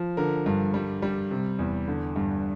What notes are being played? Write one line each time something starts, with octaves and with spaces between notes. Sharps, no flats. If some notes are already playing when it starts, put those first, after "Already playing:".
Already playing: F3
D3 A#4
G2
G3
G3
C3
E2
D3
G2